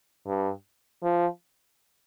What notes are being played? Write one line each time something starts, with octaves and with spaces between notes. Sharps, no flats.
G2
F3